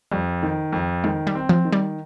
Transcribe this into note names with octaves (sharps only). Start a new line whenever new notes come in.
F2 G3
D#3
F2
D#3 G#3
G3
C4
F3
D#3
G3